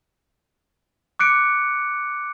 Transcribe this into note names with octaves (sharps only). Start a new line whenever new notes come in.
D6 F#6 C#7 D7